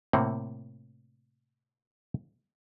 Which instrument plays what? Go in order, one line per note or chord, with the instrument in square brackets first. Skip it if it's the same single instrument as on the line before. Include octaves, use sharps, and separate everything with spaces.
[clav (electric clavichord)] A2 C3 A#3 C4 F#5